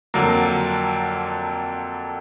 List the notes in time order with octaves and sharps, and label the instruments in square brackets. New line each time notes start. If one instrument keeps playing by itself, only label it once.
[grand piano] F2 D3 F#3 A#3